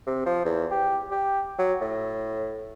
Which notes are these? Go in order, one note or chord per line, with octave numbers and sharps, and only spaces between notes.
C3
F3
E2
G4
G4
F#3
A2